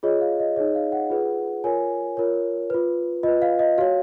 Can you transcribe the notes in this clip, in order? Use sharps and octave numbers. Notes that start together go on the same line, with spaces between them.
F4 G#4 C#5 D#5
F5
D#5
D#4 G#4 C#5 D#5
F5
F#5
F4 G#4 B4
F4 A#4 C#5 G#5
F4 A#4 C#5
F4 B4
F4 B4 D#5
F5
D#5
F#4 C#5 F5